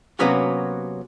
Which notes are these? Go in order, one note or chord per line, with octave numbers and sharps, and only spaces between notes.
C3 F#3 A#3 B3 C#4 F#4